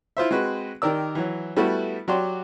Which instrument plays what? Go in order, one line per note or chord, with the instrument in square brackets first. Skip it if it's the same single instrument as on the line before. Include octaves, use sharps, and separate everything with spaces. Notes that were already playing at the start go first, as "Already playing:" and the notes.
[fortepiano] E4 F4 C5 E5
G#3 C4 F#4 B4
D#3 G4 A#4 D5 E6
E3 F#3
G3 A3 B3 E4 F#4
F#3 F#4 G4 D5 C6